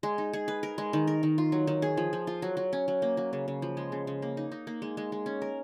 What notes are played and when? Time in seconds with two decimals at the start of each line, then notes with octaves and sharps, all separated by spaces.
0.03 G#3
0.18 D#4
0.33 G#4
0.48 B4
0.63 A#4
0.78 G#3
0.93 D#3
1.07 A#4
1.23 D#3
1.38 F4
1.52 F#3
1.67 D#3
1.82 G#4
1.97 F3
2.13 F3
2.27 F4
2.42 F#3
2.57 F#3
2.73 C#4
2.88 F#3
3.02 A#3
3.17 F#3
3.33 C#3
3.48 C#3
3.62 F3
3.77 G#3
3.92 C#3
4.07 C#3
4.22 A#3
4.37 D#4
4.52 D#4
4.67 A#3
4.82 G#3
4.97 G#3
5.12 G#3
5.26 C#4
5.42 A#4